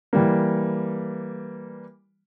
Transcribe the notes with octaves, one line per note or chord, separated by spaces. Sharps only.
E3 G3 A#3